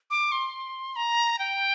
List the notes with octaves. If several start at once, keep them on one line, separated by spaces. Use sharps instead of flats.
D6
C6
A#5
G5